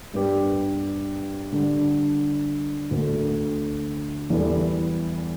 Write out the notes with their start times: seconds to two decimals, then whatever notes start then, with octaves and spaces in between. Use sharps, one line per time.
0.14 G2 G3 B3 G4
1.52 D3 G3 D4
2.91 D2 D3 A3
4.30 E2 E3 G3 E4 A4